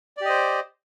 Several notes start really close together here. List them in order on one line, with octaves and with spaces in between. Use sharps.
D5 G4 D#5 C5